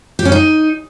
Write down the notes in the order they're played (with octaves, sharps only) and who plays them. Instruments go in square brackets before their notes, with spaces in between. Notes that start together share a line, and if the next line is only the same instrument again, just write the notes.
[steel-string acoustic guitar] G4
C#4
D#4